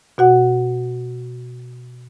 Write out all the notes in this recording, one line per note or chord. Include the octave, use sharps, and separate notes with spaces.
B2 F#4 F#5